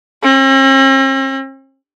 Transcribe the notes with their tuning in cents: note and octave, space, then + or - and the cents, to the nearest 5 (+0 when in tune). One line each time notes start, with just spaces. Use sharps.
C4 +45